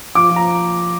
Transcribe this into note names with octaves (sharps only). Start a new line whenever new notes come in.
F3 D6
F3
A#5